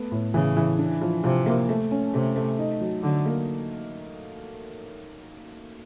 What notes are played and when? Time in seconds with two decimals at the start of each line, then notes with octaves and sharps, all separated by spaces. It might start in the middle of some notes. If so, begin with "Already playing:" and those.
Already playing: A3 B3
0.12 A2
0.34 C#3 E3
0.57 E3
0.79 D4
1.01 F3
1.24 C3 F3
1.46 A#3
1.69 A3
1.91 C#4
2.14 C3 A3
2.36 A3
2.58 D#4
2.81 F#3
3.03 D3 F#3
3.25 A#3